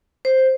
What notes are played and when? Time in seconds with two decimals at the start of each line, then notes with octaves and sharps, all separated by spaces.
0.25 C5